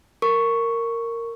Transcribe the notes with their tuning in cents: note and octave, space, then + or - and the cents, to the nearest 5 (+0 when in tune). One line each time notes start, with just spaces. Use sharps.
A#4 -15 C#6 +0